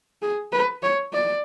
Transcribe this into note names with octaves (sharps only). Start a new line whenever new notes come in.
G#4
B4
C#5
D5